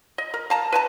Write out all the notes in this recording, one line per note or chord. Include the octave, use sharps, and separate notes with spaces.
D#5
A#4
F5 A5 A#5
B4 G#5 A5